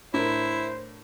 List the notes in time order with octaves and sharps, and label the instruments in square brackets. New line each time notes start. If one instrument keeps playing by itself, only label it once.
[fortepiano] A2 D4 A#4 [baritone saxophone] E4 [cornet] C5